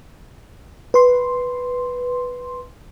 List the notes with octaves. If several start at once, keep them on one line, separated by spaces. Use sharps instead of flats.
B4 C6